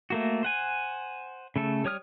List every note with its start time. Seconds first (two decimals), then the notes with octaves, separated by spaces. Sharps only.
0.10 A3 A#3 F#4
0.43 C5 F#5 G#5
1.56 C#3 A3 A4
1.85 G3 C#5 D#6 F6